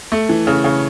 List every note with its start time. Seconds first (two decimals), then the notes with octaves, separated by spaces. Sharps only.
0.12 A3
0.29 E3
0.47 C#3
0.64 C#3